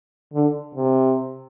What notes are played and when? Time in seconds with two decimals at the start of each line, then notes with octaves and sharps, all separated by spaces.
0.33 D3
0.75 C3